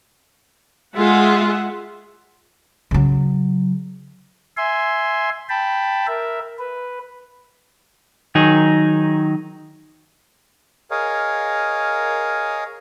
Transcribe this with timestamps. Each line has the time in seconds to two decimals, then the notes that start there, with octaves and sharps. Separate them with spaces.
0.95 G#3 F4 G#4 E5 F#5
2.91 C#3 F#3
4.57 E5 G#5 C6
5.49 G5 A5 B5
6.07 A#4 E5
6.59 B4
8.35 D#3 F#3 D#4 G#4
10.91 G#4 A#4 C#5 D#5 F5